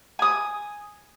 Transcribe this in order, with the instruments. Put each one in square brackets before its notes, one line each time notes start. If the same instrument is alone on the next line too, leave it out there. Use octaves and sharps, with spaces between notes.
[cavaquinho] G#5 D#6